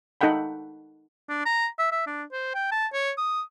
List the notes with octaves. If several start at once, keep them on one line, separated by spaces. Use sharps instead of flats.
D#4 A4 F#5 G5 B5
D4
A#5
E5
E5
D4
C5
G5
A5
C#5
D#6